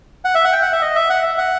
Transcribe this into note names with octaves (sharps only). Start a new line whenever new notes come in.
F#5
E5
F#5
G5
F#5
E5
D#5
E5
F#5
E5
F#5